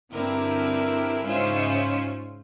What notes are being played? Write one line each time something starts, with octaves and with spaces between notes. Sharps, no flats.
G2 D3 C4 E4 A#4
G#2 C#3 C#4 F4 C5 E5